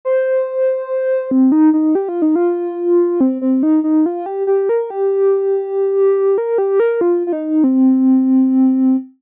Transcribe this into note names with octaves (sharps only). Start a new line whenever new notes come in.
C5
C4
D#4
D#4
G4
F4
D#4
F4
C4
C4
D#4
D#4
F4
G4
G4
A#4
G4
A#4
G4
A#4
F4
F4
D#4
C4